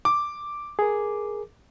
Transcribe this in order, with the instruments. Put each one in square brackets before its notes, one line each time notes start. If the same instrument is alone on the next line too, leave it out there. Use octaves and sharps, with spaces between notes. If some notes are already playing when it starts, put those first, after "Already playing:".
[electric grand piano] D6
[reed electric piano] G#4 A#4